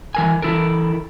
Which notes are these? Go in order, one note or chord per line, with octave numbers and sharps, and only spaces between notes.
E3 A#4 G#5
E3 E4 A4 A#4